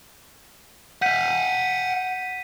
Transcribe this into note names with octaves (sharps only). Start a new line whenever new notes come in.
F5 F#5 G6 B6 D#7